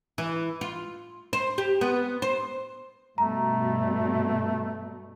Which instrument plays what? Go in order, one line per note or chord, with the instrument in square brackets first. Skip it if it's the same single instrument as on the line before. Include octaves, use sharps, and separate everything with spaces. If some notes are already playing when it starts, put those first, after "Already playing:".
[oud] E3
F4
C5
G4
B3
C5
[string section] G2 B2 [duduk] A3 [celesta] A#5